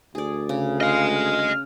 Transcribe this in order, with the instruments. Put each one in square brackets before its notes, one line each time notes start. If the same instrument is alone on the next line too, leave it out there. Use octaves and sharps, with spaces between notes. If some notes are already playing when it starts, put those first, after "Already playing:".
[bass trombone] D2 [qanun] G#4 D5
[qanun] C#3
[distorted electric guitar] D#5 G#5 [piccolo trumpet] F5
[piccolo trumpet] F6